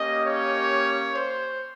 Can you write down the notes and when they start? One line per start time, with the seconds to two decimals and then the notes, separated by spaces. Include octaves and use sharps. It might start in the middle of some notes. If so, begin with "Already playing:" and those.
Already playing: A#3 C#4 G4 D#5
0.26 C#5
1.15 C5